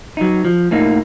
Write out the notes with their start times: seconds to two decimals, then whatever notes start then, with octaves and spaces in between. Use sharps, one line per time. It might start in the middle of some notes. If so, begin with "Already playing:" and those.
0.17 F#3 D#4
0.45 F3
0.71 A2 A#3 D#4